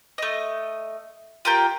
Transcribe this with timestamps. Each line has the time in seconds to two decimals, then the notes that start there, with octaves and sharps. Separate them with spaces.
0.18 A3 D#5
1.45 F4 G4 A#4 G5